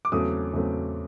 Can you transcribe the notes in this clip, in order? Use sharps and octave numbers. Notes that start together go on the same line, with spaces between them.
D6
E2 C#3 F#3 A3 C4 D#6
E2 C#3 F#3 A3 C4